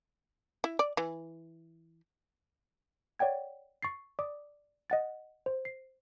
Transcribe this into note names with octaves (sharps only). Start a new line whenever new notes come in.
E4
D5
E3
C#5 D5 F#5 G5 G#6
C#6 A6 C7
D5 D6 D#6
D#5 F#5 A6
C5
C7